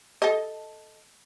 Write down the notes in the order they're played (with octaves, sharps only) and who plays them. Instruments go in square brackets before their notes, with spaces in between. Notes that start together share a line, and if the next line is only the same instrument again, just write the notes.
[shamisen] A4 D#5